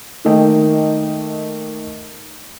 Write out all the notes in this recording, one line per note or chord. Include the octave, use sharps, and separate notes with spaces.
D#3 A3 A#3 D#5 G5